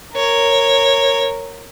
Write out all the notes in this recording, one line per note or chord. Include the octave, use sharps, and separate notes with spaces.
A#4 C#5